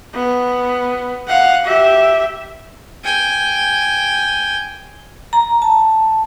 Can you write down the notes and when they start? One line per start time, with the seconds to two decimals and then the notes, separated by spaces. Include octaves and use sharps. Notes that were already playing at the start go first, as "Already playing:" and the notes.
0.14 B3
1.27 F5 F#5
1.65 G4 E5
3.04 G5 G#5
5.33 A#5
5.62 A5